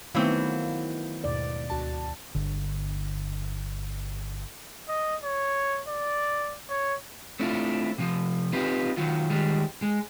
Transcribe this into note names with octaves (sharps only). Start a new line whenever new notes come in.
D#3 E3 F#3 A3 B3 C4 E4 F5
D#2 G#2 B2 D5
D2 F#4 A5
G1 D3
D#5
C#5
D5
C#5
A3 C4 D4 E4 F4
C3 F3
C4 D#4 F4 G4 B4
D#3 F#3 F4
D#3 G3 G#3
G#3